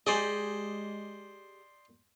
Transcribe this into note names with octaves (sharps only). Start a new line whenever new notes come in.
G#3 G4 G#4 C5 D5 D#5